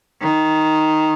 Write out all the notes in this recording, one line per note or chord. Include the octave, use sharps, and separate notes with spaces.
D#3